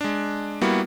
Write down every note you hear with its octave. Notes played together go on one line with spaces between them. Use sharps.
G#3 D4
G3 A#3 B3 E4 F#4